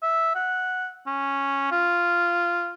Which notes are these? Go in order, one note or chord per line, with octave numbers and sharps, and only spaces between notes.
E5
F#5
C#4
F4